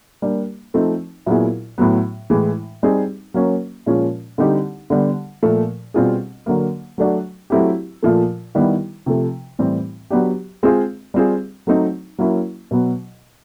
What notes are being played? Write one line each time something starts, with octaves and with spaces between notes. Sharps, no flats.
G3 A#3 D4
F3 A3 C4 D#4
A#2 F#3 B3 E4 G#4
A2 F#3 B3
A2 E3 G#3
G3 C4 D#4 G#4
F#3 A#3 C#4
A#2 F3 G#3 C#4 F4
D3 G3 C4 D#4 G4
D3 G3 B3
A#2 F3 A3
B2 G3 C4 F4 G#4
D3 F#3 A#3
F#3 A3 D4 F#4
F#3 A3 C4 E4 G4
A#2 F3 A3
D#3 G3 B3 E4
C3 F3 A3
A2 E3 G3 C4
F#3 B3 D4 G4
G#3 C4 F4 G#4
G3 C4 F4 G#4
F#3 A3 C4 D#4
F#3 A#3 C#4 E4
B2 F#3 B3